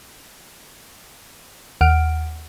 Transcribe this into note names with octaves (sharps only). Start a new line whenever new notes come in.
D#2 F#5 F6 D7